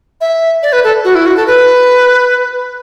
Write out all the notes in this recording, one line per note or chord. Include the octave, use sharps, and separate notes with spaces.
E5
D5
B4
A4
F#4
E4
F#4
A4
B4